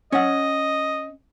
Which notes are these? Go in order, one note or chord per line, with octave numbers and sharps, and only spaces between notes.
C#4 D#5 F#5